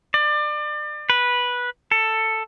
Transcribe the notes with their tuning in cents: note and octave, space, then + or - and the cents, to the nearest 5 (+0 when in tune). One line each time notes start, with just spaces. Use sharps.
D5 +30
B4 -10
A4 +10